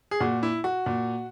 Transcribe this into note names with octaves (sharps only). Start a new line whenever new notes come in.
G#4
A#2 F#4
E4
F#4
A#2